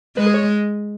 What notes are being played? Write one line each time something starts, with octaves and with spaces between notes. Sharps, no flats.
G#3 B4
G#4
C#5